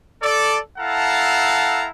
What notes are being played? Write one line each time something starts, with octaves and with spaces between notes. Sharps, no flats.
A4 D5
E4 A4 F5 F#5 A5 A#5